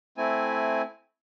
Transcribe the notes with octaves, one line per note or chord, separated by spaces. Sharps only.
A3 C4 E4 G#5